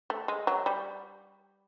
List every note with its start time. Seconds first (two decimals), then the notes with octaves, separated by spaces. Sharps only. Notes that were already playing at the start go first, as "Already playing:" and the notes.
0.10 A3
0.28 G#3
0.47 F#3
0.66 G3